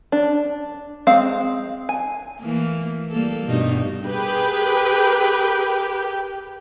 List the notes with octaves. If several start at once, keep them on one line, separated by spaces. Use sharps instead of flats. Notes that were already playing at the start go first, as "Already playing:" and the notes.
D4
G#3 C4 F5
G#5
E3 A3 A#3
G3 A#3 A4
G2 B2 D#4
G4 G#4 A#4 B4 G5